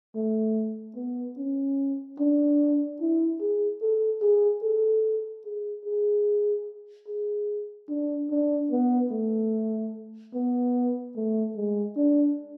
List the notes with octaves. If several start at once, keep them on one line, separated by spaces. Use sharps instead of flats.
A3
B3
C#4
D4
E4
G#4
A4
G#4
A4
G#4
G#4
G#4
D4
D4
B3
A3
B3
A3
G#3
D4